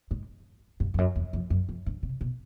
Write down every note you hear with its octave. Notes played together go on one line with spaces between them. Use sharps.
G#2
G2
F2
F#2
E2
F2
F#2
F2
G2
C3
B2